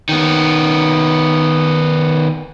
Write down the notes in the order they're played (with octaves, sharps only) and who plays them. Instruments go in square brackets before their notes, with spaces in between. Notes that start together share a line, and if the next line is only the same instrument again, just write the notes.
[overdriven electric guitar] D#3 B3